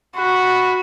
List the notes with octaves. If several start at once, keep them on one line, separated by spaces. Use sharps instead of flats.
F#4 B5